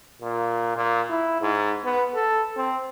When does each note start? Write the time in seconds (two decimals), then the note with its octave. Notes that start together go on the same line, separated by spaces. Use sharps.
0.22 A#2
0.76 A#2
1.10 E4
1.41 G#2
1.85 B3
2.15 A4
2.57 C4